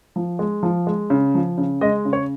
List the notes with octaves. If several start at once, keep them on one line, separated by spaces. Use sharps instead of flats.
F3
G#3
F3
G#3
C#3
F3
C#3
G#3 D#5
C#3
C#5